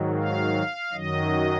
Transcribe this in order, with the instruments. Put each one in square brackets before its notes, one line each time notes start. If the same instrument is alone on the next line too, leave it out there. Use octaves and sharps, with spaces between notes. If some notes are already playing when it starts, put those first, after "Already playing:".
Already playing: [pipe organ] G#2 D#3 F#3
F5
F#2 D#3 F#3 D#5